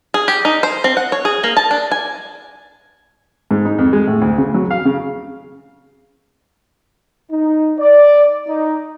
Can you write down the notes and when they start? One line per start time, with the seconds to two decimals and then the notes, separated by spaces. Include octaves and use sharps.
0.14 G#4
0.28 G4
0.45 D#4
0.63 C5
0.84 C4
0.97 F#5
1.12 C#5
1.25 G#4
1.44 A#3
1.57 A5
1.71 D4
1.91 G#5
3.51 G#2
3.65 D#4
3.78 F2
3.93 G#3
4.07 A2
4.21 D2
4.38 C#3
4.54 F#3
4.71 F5
4.85 C#3
7.31 D#4
7.79 D5
8.48 D#4